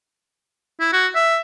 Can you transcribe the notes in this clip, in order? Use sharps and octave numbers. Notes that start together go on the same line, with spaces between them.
E4
F#4
E5